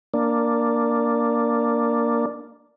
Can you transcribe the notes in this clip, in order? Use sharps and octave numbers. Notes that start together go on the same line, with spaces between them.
A#3 D4